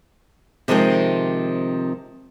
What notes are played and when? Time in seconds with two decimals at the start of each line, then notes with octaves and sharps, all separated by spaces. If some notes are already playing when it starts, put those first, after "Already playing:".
0.68 C3 D#3 F3 G#3 C4